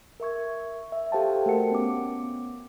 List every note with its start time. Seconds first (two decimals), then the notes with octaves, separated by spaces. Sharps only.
0.20 A#4 E5 C#6 G#6
0.92 E5
1.12 G4 A4 C5 F5 G5 A5
1.46 A3 F#4 A#4 F#5 C#7
1.71 B3 C#4 D6